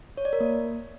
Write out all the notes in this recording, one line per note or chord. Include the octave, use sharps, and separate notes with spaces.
C#5
D5
A#4
A#3